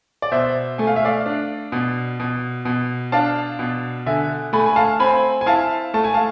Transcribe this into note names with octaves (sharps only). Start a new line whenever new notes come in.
D5
B2 C5 E5
A3 G#5
F5
E5
D5 F5
D4
B2
B2
B2
D4 F5 A5
B2
D3 E5 G#5
A3 G#5 B5
G#5
F5 A5
C4 G#5 B5
G#5
E4 F5 A5
A3 A5
G#5
F5 A5